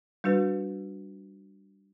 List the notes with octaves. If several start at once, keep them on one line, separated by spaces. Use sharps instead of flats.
G3 D4 F#4 B4